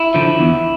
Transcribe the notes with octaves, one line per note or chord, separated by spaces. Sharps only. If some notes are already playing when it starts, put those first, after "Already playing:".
Already playing: E4
D3 F3
E2